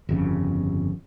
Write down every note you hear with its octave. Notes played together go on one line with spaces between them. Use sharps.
G1 F2 C#3